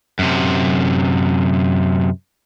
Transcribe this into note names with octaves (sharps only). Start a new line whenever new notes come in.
F#2 C3